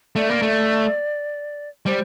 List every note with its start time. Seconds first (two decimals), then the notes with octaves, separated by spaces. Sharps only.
0.16 A3 D5
0.29 A#3
0.42 A3
1.86 G3 C5